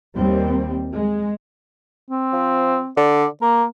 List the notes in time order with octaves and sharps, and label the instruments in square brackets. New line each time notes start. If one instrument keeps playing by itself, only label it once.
[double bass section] D#2 G3 C4
G#3
[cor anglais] C4
[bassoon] F3
[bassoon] D3 [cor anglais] D5
[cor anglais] A#3 [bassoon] A#4